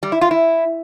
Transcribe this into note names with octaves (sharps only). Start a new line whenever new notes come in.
G3
E4
F4
E4